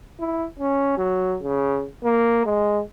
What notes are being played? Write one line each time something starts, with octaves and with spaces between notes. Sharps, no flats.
E4
C#4
F#3
C#3
A#3
G#3